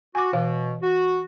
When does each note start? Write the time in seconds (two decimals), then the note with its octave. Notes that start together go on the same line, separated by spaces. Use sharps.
0.15 F#4 G#5 D6
0.33 B2 E3 F5
0.82 F#4